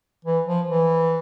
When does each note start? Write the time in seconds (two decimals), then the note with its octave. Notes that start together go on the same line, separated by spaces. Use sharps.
0.25 E3
0.46 F3
0.68 E3